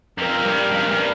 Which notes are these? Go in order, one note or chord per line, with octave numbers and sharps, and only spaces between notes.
F2 A#4
G2
F2
A#2
G2